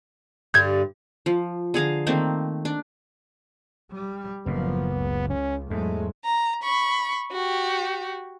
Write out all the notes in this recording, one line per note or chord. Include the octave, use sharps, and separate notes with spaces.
G2 D3 G3 G6 G#6
F3
D3 G#4 F5 A#5
D#3 A3 A#3 C4
D4
G3
F#1 A2 F3 A#3 B3
C#2
C#4
E2 G#2 F#3 G#3 A3
A#5
B5 C#6
F#4 G4